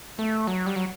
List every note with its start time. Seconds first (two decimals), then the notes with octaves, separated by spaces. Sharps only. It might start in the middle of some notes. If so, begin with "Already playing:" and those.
0.19 A3
0.47 F#3
0.66 G3
0.76 F#3